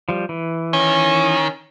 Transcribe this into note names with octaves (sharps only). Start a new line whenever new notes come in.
F3 G3
E3
D#3 C#4